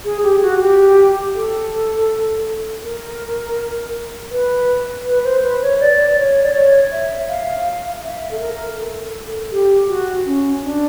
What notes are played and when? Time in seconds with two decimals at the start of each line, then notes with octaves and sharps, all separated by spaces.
0.05 G#4
0.23 G4
0.42 F#4
0.60 G4
1.35 A4
2.83 A#4
4.31 B4
5.06 B4
5.24 C5
5.43 B4
5.62 C#5
5.80 D5
6.17 C#5
6.44 D5
6.54 C#5
6.91 E5
7.29 F5
7.66 F5
8.03 E5
8.31 A4
8.40 A#4
8.77 A4
9.51 G4
9.88 F#4
10.26 C#4
10.63 D4